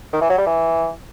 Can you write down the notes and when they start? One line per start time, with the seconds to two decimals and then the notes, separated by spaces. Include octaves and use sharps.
0.13 D#3
0.21 E3
0.30 F#3
0.38 G3
0.46 E3